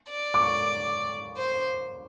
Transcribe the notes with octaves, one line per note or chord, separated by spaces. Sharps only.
D5
D6
C#6
C5